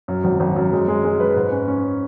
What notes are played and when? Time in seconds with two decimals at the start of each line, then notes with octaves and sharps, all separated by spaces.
0.08 F#2
0.24 G#1
0.40 G#1
0.56 F#2
0.72 G#3
0.88 G#3
1.04 G#3
1.20 B4
1.36 G#2
1.52 C#4
1.68 C#4